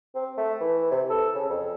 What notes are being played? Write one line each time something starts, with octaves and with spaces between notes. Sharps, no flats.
C4
A3
E3
C3
A4
C#3
F2